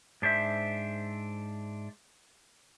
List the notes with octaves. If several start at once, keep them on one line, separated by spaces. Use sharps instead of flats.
G#2 D4 C5 E5